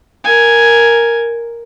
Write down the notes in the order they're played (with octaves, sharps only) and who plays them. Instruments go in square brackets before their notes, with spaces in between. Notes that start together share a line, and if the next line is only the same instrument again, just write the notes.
[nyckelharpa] A#4 G#5